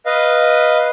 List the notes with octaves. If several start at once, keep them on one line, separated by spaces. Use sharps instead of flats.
B4 D#5 F5